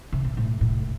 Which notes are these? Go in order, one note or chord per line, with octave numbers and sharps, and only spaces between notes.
C3
B2
A2
A2